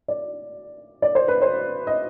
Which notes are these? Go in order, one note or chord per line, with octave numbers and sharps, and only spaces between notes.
D5
D5
C5
B4
C5
D#5